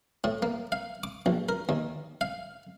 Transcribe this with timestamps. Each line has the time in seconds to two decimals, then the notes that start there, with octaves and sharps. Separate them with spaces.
0.24 A2
0.42 A#3
0.72 F5
1.04 D6
1.26 A#1
1.49 A#4
1.69 D#2
2.21 F5